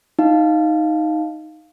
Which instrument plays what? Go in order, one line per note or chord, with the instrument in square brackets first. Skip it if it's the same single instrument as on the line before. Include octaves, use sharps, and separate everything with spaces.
[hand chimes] D#4 F5